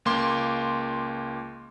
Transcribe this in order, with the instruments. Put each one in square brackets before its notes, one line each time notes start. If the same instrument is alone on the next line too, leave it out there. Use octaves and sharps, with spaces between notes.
[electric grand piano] C#2 A#3 C6 D6